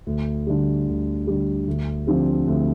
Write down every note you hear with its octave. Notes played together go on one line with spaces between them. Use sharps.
D2
D3 G3
D2
D3 G3
D2
D3 F3 C4 G4
D2